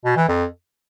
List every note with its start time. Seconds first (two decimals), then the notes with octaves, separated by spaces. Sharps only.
0.05 B2
0.17 E3
0.28 F2